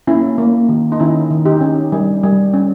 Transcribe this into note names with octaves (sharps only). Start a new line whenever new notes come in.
A#3 C#4 E4
A#3
D#3
D#4
D#3 C#4 E4
D#3
D#4 G4
C#4
G3
G3
C#4